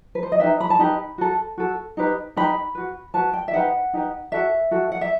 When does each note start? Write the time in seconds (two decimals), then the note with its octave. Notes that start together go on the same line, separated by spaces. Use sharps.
0.15 B4
0.23 C5
0.32 D#5
0.40 D#4 G4 B4 E5
0.60 B5
0.70 A5
0.79 D#4 G4 B4 B5
1.18 F#4 A4
1.58 F#4 A4
1.97 D#4 G4 B4
2.36 D#4 G4 B4 B5
2.75 F#4 B4
3.14 F#4 B4 A5
3.33 G5
3.48 E5
3.53 D#4 G4 B4 F#5
3.93 D#4 G4 B4
4.32 F#4 A4 E5
4.71 F#4 A4
4.92 F#5
5.01 E5